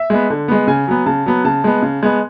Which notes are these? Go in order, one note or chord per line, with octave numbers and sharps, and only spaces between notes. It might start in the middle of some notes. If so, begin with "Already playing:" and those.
Already playing: E5
G#3 B3
D3
G#3 B3
C#3 G#5
F#3 B3
C#3 A5
F#3 B3
C#3 A5
G#3 B3
C#3
G#3 B3